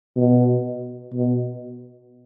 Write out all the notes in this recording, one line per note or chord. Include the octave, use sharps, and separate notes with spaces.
B2
B2